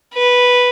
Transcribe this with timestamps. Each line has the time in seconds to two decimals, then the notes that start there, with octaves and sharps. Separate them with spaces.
0.14 B4